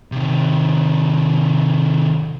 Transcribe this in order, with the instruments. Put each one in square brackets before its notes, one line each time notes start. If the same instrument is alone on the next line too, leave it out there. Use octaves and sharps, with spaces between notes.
[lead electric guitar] C3 D#3